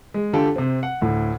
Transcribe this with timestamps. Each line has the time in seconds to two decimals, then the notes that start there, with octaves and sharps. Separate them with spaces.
0.14 G#3
0.33 D3 D4 F4 G4 A4
0.56 C3 C4
0.83 F#5
1.01 D2 A2